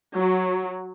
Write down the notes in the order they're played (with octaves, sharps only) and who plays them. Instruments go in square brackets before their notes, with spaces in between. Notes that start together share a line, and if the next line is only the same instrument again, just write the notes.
[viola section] F#3